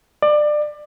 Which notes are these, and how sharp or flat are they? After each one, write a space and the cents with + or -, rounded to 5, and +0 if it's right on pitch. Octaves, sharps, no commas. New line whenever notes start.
D5 +25